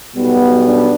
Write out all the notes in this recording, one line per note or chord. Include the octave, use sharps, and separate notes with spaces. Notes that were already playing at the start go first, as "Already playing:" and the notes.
B1 B2 G3 B3
D4